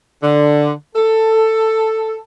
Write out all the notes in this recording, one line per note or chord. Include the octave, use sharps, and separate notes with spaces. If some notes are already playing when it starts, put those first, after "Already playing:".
D3
A4